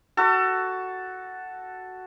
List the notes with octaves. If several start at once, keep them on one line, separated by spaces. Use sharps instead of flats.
F#4 A4